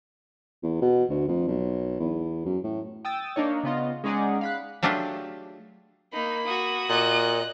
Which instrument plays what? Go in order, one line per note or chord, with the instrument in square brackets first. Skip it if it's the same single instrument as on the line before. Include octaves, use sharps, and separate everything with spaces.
[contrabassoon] E2
B2
D2
F2
B1
E2
F#2
A2
[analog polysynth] G5 D#6 E6 A6
A#3 D4 D#4 C#5
C#3 B3 F4 D#5
G#3 C#4 D#4 G#4 D5 F#5
F5 B5 F#6
[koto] F#3 A3 D4 F4 G4 G#4
[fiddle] A#3 B5 [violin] D#4
[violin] F#4 D#6
[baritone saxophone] A#2 [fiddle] D#5 F#6